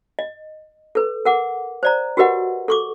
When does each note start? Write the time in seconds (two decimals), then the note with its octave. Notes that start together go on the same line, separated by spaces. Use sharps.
0.19 D#5
0.95 A4 B4
1.25 A#4 F#5 D6
1.83 C5 D5 A#5
2.17 F#4 G4 A#4 B4 D#5 F#5
2.68 A4 C#6 D6